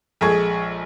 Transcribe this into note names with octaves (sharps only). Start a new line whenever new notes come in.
A#1 G#3 G#4 A4 C#6 G#6